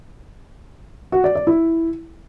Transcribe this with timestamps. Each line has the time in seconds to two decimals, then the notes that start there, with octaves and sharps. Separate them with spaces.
1.12 F#4
1.24 D5
1.35 D5
1.47 E4